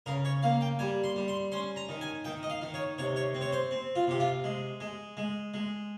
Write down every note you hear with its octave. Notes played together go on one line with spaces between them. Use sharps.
C#3 A#4
C#5
A#3 F5
G5
G3 G#5
C6
G3
C6
C#4 C6
A#5
D#3
G#5
D#3 G5
D#5
F5
D#3
C#5
C3 C#5
C#5
C4
C#5
C5
C4
F4
C3 G4
F4
G#3
G#3
G#3
G#3